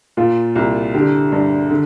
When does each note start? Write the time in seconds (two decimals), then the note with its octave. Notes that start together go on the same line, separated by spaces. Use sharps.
0.17 A#2 F4
0.55 C2
0.94 D3 G4
1.32 G2
1.70 D3